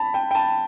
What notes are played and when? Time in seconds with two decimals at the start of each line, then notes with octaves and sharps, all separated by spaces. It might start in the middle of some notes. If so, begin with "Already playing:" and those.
Already playing: A5 B5
0.14 G5
0.31 G5
0.35 A5